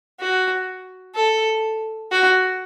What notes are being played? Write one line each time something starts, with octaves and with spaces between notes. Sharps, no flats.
F#4
A4
F#4